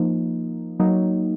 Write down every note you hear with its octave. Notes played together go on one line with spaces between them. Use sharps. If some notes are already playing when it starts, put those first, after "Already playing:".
Already playing: F3 A#3 D#4
F#3 A#3 D#4